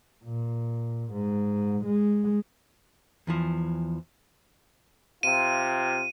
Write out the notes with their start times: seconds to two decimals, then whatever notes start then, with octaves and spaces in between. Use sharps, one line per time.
0.23 A#2
1.12 G#2
1.85 G#3
3.27 E2 E3 F3
5.23 C3 F4 D#7